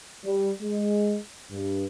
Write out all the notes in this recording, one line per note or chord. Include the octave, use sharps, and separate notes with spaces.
G3
G#3
G2